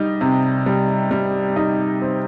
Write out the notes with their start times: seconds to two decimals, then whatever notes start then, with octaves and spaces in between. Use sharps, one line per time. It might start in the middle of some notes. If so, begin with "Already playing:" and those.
Already playing: G3 D#4
0.21 C3
0.66 G3
1.11 G3
1.56 D#4
2.02 C4